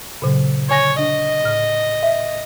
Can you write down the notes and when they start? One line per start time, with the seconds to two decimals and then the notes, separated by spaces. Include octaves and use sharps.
0.22 A#2 C#3 F#3
0.69 D3 C#5 G#5 A#6
0.99 D4 D#5
1.44 A2 F6
2.03 E5